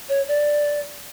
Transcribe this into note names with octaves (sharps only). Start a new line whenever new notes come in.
C#5
D5